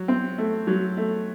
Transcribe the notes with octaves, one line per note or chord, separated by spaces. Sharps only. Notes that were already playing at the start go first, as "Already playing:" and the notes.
Already playing: F#3
C4
A3
F#3
A3